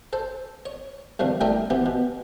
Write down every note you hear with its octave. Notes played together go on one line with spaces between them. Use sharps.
A4 C5
C#5
G2 C3 D#3 F3
G3 A3 E4 G4 A4 A#4
E3 B3 C4 G4
B2